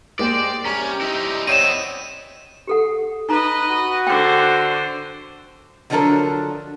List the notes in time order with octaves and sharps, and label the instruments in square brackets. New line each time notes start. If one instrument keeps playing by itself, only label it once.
[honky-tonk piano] G#3 A#3 [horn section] G4 C5 [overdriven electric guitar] D5
[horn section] C3 G3 G4 [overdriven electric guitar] C#4 [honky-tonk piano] A#5
[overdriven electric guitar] D#4 E4
[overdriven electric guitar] B3 C4 [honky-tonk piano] C#5 D#5 [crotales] D#7 E7
[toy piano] G4 A4 F#5
[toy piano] D#4 A#5 [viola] B4 D#5
[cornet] F#4
[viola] D3 C5 [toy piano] G5
[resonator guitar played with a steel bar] D3 F3 F#3 D4 A4 A#4